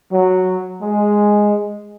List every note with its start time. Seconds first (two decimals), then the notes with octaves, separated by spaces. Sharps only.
0.12 F#3
0.82 G#3